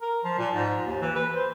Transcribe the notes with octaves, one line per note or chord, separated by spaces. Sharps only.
A#4
F3
A#2
G#2
D#2
E3
B4
C5